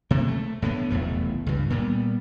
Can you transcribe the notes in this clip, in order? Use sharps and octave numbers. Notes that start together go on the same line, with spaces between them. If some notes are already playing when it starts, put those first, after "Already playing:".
C3 A#3
A3
A2 D3 B3
F1 B1 E2 A3
C#2 G2
A#2 G3 B3